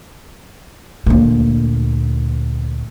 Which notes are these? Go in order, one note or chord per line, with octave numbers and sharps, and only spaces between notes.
D2 A#2